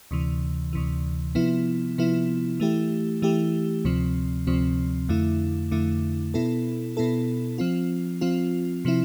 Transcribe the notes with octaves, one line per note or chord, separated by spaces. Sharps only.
D2 C3 E3
D2 C3 E3
C3 F3 B3 E4
C3 F3 B3 E4
E3 A3 E4 G4
E3 A3 E4 G4
D2 C3 F3 C4
D2 C3 F3 C4
F2 D3 A3 E4
F2 D3 A3 E4
B2 B3 E4 A4
B2 B3 E4 A4
F3 C4 F4
F3 C4 F4
C3 F3 C4 E4